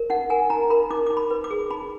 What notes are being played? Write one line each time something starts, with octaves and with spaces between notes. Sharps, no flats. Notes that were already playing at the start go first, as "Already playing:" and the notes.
Already playing: A#4
D#4 F#5
A#4 G#5
D#4 A#5
A#4 B5
D#4 D6
D6
D#4
B5
B4
D6
G#4
D#4 B5